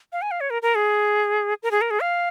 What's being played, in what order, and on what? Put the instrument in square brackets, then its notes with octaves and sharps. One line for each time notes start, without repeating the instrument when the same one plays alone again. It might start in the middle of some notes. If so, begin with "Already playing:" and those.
[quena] F5
G#5
F5
C#5
A#4
A#4
G#4
A#4
G#4
A#4
G#4
F5